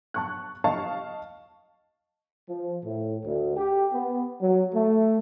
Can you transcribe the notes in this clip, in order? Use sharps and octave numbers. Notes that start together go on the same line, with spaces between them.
A5 C#6 F#6
D#5 F5 A5 C#6
F3
A2
D2
G4
B3
F#3
A3